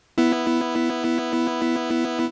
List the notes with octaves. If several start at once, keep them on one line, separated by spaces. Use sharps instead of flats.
B3 E4